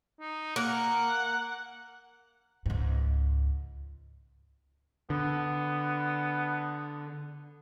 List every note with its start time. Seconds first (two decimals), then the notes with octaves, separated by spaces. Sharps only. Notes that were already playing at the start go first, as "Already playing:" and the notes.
0.20 D#4
0.56 A#3 F#5
2.66 C#2 G#2
5.10 D3 B3